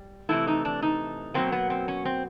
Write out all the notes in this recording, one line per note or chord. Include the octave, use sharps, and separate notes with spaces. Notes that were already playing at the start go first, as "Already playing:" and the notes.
Already playing: G3
C3 E3 A3 E4
D#4
D4
D#4
B2 F#3 A#3 C4
B3
C4
C#4
C4